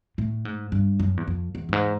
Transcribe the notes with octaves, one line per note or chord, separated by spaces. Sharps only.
A2
G#2
G2
F#2
E2
F2
E2
G2
G#2